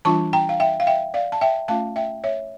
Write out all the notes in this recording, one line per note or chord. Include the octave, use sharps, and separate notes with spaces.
E3 G3 D4 F4 A5 C#6
G5 A#5
F5
E5 G5
F5
E5 G5
D5 F5
A5
E5 G5
A3 C#4 F4 F5 A5
E5 G5
C#5 E5